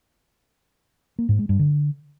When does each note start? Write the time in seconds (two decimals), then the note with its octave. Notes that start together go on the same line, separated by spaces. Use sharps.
1.19 A#3
1.29 G#2
1.39 G#3
1.49 G2
1.59 D3